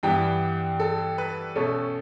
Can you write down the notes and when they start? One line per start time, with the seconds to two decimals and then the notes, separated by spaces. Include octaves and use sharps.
0.03 G2 E3 G3 B3 G5
0.80 A4
1.18 B4
1.55 B2 A3 C#4 A4